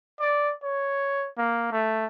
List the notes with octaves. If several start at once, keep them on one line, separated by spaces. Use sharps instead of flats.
D5
C#5
A#3
A3